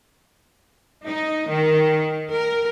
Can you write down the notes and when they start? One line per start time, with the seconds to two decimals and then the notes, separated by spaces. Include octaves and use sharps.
1.05 D#4
1.48 D#3
2.30 A#4